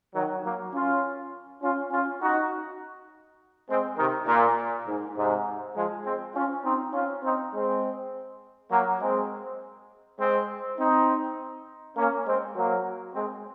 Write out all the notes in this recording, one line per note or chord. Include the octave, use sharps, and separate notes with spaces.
D#3 F#3
F#3 A#3
C#4 F4
C#4 F4
C#4 F4
D#4 F#4
G#3 C4
C3 D#3
A#2
G#2
G#2 C3
F3 G#3
G#3 C4
C#4 F4
C4 D#4
C#4 F4
C4 D#4
G#3 C4
F#3 A#3
G#3 C4
G#3 C4
C4 D#4
A#3 C#4
G#3 C4
F#3 A#3
G#3 C4